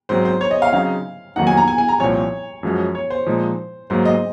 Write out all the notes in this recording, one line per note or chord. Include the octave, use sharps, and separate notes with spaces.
G#2 F#3 C4 C5
C5
C#5
D#5
F5
C#3 F#3 C4 D#4 F5
F2 D#3 F#3 A#3 D#4 F#5
G#5
A#5
G#5
G#5
A#5
C2 A#2 F3 C4 C#5
F#2 F3 G#3 C#4 F#4
C#5
C5
A#2 F3 G#3 D#4
G#2 F#3 A#3 C5
D#5